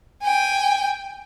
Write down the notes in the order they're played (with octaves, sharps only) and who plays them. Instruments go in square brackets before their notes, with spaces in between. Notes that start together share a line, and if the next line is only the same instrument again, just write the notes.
[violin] G5 G#5